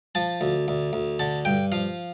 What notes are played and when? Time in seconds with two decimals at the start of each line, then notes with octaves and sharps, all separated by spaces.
0.15 F3 A5
0.41 D2
0.68 D2
0.93 D2
1.19 D3 A5
1.45 G2 G5
1.72 F3 F5